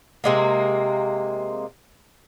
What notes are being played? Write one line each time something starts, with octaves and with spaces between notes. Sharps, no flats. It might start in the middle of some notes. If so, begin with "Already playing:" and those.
C3 G#3 A#3